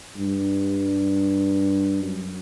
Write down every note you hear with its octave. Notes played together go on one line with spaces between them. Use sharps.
G2
F#2